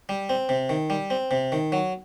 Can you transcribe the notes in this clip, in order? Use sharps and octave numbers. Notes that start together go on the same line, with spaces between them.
G3
C4
C3
D#3
G3
C4
C3
D#3
F#3